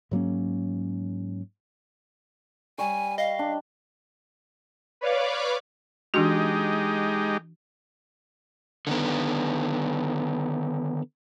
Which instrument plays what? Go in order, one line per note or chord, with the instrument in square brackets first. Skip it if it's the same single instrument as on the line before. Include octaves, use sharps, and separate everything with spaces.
[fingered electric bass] G#2 F#3 A#3 C#4
[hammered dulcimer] G3 C#6 [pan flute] G#5
[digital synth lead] D#5 [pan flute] F5
[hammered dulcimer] D4
[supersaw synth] B4 C#5 D5 F5 D6
[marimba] E3 D4 F#4 [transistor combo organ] G#3 D#4 G4
[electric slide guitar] D3 D#3 B3